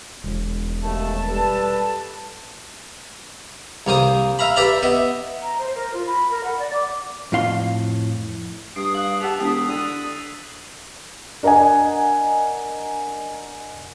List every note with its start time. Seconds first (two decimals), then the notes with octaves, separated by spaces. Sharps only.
0.24 E1
0.83 D#2 A3 A5
1.27 G3 A4 B4
3.87 C2 A#3 C5 D#6
4.39 E5 F5 A#5 B5
4.56 G4 B4 D5 E5 A#5 B5
4.82 B3 D#5 E5
5.41 A#5
5.58 C5
5.75 A#4
5.93 F4
6.07 B5
6.31 A#4
6.44 F#5
6.59 D5
6.73 D6
7.32 F2 A2 F5 C6
8.76 G2 D#6 C7 D7
8.94 F5 F#6 C7 F#7
9.21 G4 B4 F#5 A5 E6 B6 F7
9.39 E1 G4 D#6
9.68 D3 A6 D#7 F7
11.43 D4 A#4 D#5 F#5 G#5